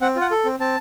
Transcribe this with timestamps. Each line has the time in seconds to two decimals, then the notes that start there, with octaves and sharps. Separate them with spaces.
0.01 C4 F#5
0.16 F4
0.21 F#5
0.31 A4
0.45 C4
0.60 C4 A5